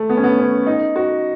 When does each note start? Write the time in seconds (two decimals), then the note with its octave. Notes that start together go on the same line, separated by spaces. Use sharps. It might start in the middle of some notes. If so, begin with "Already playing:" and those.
Already playing: A3
0.10 B3
0.17 C#4
0.24 B3
0.38 C#4
0.67 D#4
0.96 F#4